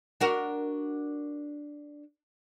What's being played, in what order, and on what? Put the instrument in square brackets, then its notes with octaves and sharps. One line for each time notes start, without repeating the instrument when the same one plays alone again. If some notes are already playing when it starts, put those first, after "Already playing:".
[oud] D4 F#4 A#4